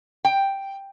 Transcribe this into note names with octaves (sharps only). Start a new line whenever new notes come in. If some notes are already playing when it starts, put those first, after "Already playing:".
G5